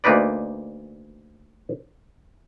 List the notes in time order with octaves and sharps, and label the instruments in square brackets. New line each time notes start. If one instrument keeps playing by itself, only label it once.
[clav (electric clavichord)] D2 A#3 D#4 B4 D5